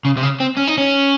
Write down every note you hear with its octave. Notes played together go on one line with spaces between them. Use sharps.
C#3
C3
C#3
C4
C#4
D#4
C#4